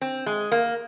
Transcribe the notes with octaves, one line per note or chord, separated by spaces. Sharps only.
C4
G#3
A#3